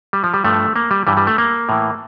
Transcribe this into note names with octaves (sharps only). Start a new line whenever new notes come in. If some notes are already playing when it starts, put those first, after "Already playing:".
G3
F3
G3
G2 F3 A3
A#3
G3
G2 E3 G3
G3
A3
A#3
A2 E3